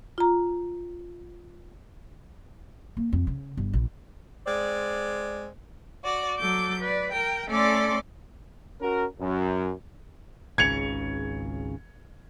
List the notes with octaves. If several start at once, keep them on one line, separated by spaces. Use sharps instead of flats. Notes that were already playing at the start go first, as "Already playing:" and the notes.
F4 A#5
A#3
F2
C#3
G1
A#1
G#3 C4 D5
F#4 D5
F#3 A4 D6 G6
B4 D5
A#4 G5
A3 C#4 A4 D5 C6 D6
C#4 F#4 A#4
F#2
G#1 C#2 C#3 G#6 C#7 F7